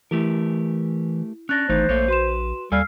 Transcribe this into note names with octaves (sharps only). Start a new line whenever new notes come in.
E3 A3 E4 G4 A#4
C#4 D4 F#6 A6 A#6
G#1 E3 A3 D#4 C5
A#1 A3 A#3 C#5
F#4 B4 C6 E7
D#2 G3 A4 F5 G#5 E6 F6 C7